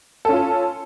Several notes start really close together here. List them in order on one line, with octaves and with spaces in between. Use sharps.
A4 C#4 F4